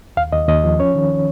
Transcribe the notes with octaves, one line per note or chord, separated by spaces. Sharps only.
D#2 F5
D#2 D#5
D#2 D#5
F3
C#4 C#5
D#3